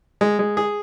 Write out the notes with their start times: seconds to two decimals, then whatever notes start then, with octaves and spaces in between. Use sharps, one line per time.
0.21 G#3
0.39 G#3
0.57 G#4